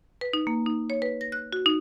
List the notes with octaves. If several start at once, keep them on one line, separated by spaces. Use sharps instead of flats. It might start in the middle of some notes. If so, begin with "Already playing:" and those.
B4
D#4
A#3
D#4
C#5
B4
A#6
F#6
F#4
D#4